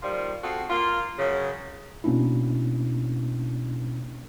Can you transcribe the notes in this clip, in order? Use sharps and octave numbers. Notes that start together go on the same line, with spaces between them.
D#3 F3 G3 F4
C4 F4 F#4 G#4 A4
A#3 F4
F#2 C#3
B2 A#3 C#4 D4 E4